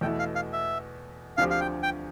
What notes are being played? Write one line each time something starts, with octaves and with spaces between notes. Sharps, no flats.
E2 B2 A3 E4 G5
F5
F5
E5
D2 D3 F3 C4 G4 F5
F5
G5
G5